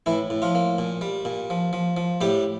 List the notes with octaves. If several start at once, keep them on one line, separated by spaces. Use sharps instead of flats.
A2 E3 E4
A2
F3 F4
A#3
A#2
G3
A#2
F3
F3
F3
A2 G3 G4